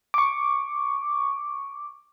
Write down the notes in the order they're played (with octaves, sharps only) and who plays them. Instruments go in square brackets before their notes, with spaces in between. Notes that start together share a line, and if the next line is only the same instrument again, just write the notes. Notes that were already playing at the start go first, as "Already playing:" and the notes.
[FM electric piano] C#6 D6